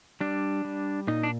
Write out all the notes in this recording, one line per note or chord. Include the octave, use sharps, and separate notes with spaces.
G3 D4
G3
A#2 D#4
D4